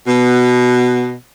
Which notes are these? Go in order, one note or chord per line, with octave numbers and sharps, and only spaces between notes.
B2